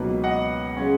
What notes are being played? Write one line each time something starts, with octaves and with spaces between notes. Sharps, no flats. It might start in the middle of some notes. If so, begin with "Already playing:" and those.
Already playing: C#2 B2 F#3 A#3 D#4 B4
D#5 F#5
C#3 G#3 C#4